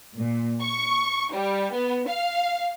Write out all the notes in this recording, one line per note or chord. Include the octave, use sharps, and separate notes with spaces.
A#2
C#6
G3
B3
F5